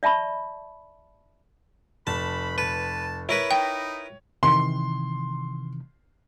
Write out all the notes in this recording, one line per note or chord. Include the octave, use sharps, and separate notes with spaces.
D5 E5 A5 B5 C#6
F1 A5 B5
B4 A5
E4 A#4 B4 C#5
D#4 G5
C3 D#3 E3 C6